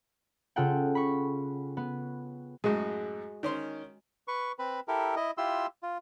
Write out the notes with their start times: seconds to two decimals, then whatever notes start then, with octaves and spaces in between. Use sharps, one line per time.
0.56 C#3 F4 A4 F#5 G5
0.95 B5 C#6
1.77 B3
2.64 F#2 A2 G#3 F#4
3.43 D#3 C#4 C6
4.28 B4 C#6
4.59 C4 B4 B5
4.88 E4 G4 A4 A#4
5.16 E4 D#5
5.38 E4 F4 G4 C6 E6
5.83 F4